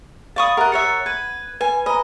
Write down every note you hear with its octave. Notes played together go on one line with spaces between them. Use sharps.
D5 F5 B5 C#6 D#6
G4 A#4 D#5 E5 F#5 F#6 A6
A#4 C#5 E5 A6 C#7
B4 G#6 D#7
B4 G#5
C5 D#5 G#5 A#5 B5